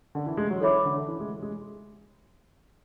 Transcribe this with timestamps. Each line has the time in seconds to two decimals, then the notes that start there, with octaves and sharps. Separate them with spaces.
0.15 D3
0.26 E3
0.37 G#3
0.50 F#3
0.61 E3 A4 C#5 E5 B5 D6
0.85 D3
1.08 E3
1.20 G#3
1.42 G#3